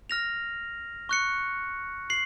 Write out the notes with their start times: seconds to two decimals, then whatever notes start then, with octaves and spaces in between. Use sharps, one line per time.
0.10 F6 A#6 F7
1.09 C#6 F#6 C#7
2.10 C7 F#7